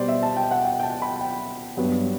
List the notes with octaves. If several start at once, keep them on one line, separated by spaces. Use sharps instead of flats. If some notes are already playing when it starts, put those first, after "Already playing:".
Already playing: B2 G3 B3 C5 D5
E5
A5
G5
F#5
G5
G5
A5
B5
G5
G2 F#3 B3